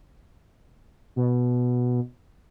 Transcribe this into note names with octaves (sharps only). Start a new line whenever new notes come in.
B2